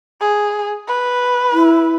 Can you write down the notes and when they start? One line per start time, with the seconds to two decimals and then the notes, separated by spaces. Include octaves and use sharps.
0.20 G#4
0.88 B4
1.53 E4